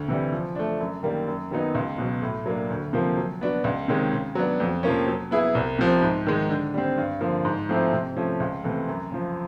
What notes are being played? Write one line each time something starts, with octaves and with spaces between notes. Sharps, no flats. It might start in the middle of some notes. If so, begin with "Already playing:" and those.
Already playing: D2
C3 E3 G3
F3
A3 D4
F#2
D#3 G3 A#3
F#2
D#3 F#3 B3 D#4
C#2
B2 F#3
A2
F#3 A#3 D4
D2
C3 F3 A#3
F#3
B3 D4 F#4
C#2
C3 D#3 G#3 C#4
C#3
F#3 B3 D4
F2
C3 F3 A#3 C#4
F#3
B3 E4 G#4
C2
C3 F3
G#2
D#3 G#3
D3
G3 C4
G2
D3 F3 A#3
G#2
F3 A3 C4 E4
C3
F3 A3 C#4
C#2
C3 E3 A3
F#2
C#3 F3